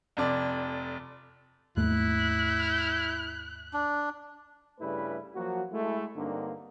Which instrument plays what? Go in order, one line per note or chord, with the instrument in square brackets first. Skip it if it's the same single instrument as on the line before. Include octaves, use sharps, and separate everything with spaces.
[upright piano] F1 F2 D5
[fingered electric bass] D#2 G#2 A3 [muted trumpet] E4 [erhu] F#6
[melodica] D4
[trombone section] G2 C#3 G3 A3 E4 B4
F3 F#3 A#3 F#4
G#3 A3 E4
G2 D3 A#3 C4 D4 D#4